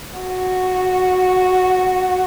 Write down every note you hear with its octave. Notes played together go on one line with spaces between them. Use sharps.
F#4